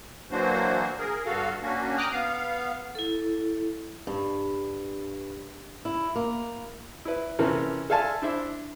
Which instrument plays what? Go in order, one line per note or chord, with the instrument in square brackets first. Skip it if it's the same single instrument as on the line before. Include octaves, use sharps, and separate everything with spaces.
[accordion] E3 F#3 A#3 D4 F#4 C5
G#4 A#4
G2 F#4 A4 F5
A#3 C#4 D4 F#4
G5 A#5 D6 D#6 F6 F#6
B3 F5
[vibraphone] E4 A4
[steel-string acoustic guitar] G2
E4
A#3
[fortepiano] E4 B4
C3 E3 A#3 C#4 A4 A#4
A4 E5 F5 G#5 A5 C6
D4 E4 C5 E5